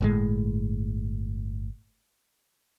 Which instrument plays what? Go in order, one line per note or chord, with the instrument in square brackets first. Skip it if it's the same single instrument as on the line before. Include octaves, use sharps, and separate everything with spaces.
[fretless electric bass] G1 A2 G#3